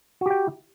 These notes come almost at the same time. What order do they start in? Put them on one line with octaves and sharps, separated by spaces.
F#4 G4 G5